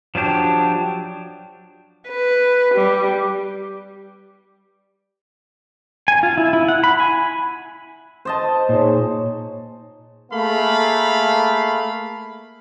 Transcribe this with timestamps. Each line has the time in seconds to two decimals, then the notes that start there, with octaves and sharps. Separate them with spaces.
0.15 F3 F#3 D4 G4
2.08 B4
2.75 G3
6.08 G#5
6.23 F4
6.38 E4
6.53 E4
6.68 F#5
6.84 B5
7.00 G#5
8.25 C5 D#5 A5
8.69 A#2 D#4 G#4 C#5
10.32 A3 A#3 G#4 F5 B5